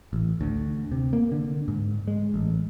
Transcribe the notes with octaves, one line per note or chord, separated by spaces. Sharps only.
A1
D2
C3
A#3
D3
G#2
G#3
A1